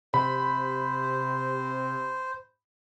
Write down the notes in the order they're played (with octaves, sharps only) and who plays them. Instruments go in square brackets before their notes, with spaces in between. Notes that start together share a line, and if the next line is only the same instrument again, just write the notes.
[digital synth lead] C3 [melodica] C5 [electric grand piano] B5